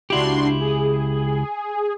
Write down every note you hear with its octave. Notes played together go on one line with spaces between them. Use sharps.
C#2 D4 E4 F#4 G4 C6
G#4